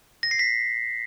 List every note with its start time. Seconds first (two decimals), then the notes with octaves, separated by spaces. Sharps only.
0.23 A#6
0.31 C7
0.39 B6